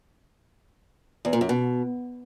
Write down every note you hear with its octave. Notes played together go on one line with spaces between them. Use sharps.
E2
A#2
F#2
B2